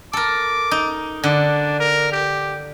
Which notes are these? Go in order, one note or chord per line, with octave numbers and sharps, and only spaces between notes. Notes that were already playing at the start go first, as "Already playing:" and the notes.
A4 A#4 D6
D#4
D3 D4
A#4
G4